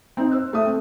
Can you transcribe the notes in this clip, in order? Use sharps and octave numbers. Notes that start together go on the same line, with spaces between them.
C4 D#4
C5 E6 F#6
A3 E5 D#6
C4